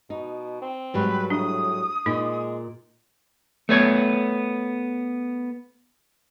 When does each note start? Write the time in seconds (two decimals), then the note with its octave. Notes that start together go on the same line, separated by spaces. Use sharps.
0.10 B2 D#4
0.62 C4
0.94 G#2 F#3 G3 B4
1.30 A2 D4 D#6
2.06 A#2 G#3 D#4
3.69 A3 B3 C#5